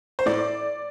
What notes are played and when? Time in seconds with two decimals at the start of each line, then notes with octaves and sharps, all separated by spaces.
0.19 C5
0.26 A2 D5